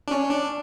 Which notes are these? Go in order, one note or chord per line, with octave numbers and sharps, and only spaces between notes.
D4
C#4
D4